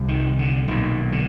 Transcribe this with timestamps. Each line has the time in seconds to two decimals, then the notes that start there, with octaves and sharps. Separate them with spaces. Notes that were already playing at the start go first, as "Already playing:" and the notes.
Already playing: C2 C3
0.08 D#3
0.39 D3
0.68 B1 A#2 D#3
1.12 D3